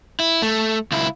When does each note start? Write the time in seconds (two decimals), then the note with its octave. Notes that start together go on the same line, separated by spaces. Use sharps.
0.20 E4
0.42 A3
0.92 C#2 E4